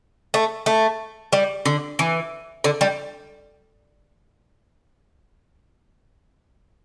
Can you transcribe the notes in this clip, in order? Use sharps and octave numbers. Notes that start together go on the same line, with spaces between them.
A3
A3
G3
D3
E3
D3
G3